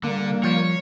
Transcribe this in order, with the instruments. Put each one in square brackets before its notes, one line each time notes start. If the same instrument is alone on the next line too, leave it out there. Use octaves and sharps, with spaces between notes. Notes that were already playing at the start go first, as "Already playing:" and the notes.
[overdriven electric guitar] D3 [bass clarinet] G3 [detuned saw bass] A#3
[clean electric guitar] F3 [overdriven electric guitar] C#5